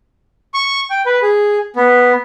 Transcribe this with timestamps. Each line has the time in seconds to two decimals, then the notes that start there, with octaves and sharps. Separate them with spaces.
0.54 C#6
0.90 G5
1.06 B4
1.22 G#4
1.76 B3